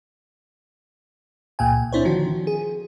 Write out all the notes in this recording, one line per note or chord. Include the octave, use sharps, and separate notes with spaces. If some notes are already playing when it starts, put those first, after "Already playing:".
C#2 A#2 G5 G#5
C4 D4 E4 C5 C#5
D3 D#3 F3 F#4
G#4